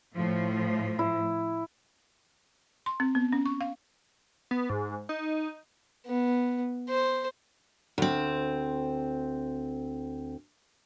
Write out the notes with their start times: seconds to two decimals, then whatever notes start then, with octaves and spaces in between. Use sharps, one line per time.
0.16 A2 F3
0.99 E4
2.86 C6
3.00 C4
3.15 B3
3.32 C#4
3.46 C#6
3.61 F5
4.51 B3
4.70 G#2
5.09 D#4
6.06 B3
6.89 C5
7.98 D2 C4